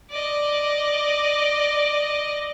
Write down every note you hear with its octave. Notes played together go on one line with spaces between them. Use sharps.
D5 D#5